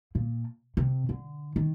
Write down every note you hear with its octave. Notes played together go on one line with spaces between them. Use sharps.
A#2
C3
D3
D#3